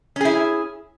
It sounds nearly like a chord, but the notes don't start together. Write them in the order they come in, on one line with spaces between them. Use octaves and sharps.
C#4 G#4 E4